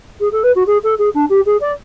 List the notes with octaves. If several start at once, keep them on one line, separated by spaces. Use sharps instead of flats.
G#4
A4
B4
F#4
G#4
A4
G#4
D4
G4
G#4
D5